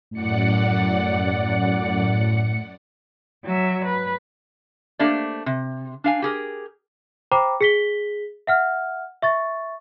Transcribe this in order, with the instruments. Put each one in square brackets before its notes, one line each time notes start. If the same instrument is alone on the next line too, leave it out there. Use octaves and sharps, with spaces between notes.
[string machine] F#2 D5 F#5 [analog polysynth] A2 C#7
[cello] F#3 E5
B4
[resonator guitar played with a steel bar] A3 A#3 D4 G4 C5 D5
C3
D4 F5 G#5
G4 G#4 A#4
[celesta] C5 G5 A#5 B5 D6
G#4 B6 G7
E5 F#5 F6
E5 C#6 A6